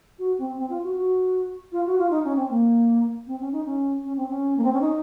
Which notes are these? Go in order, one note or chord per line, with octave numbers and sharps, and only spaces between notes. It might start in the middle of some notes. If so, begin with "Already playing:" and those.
F#4
C4
C4
F4
F#4
F#4
F4
F#4
F4
D#4
C#4
C4
A#3
C4
C#4
D#4
C#4
C#4
C4
C#4
A#3
C4
C#4
D#4